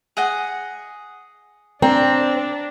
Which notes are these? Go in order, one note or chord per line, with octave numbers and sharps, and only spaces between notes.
G#4 D#5 F#5
C4 D4 D5 G5 A#5